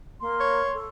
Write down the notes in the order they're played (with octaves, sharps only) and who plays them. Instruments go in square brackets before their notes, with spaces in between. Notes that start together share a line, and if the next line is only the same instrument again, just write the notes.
[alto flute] A#3 [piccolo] C6
[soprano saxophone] C#5
[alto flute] A4